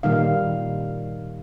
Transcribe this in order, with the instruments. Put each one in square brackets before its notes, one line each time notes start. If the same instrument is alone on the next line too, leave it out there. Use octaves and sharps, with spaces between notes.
[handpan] A#2 D#3 G3 D#4 F5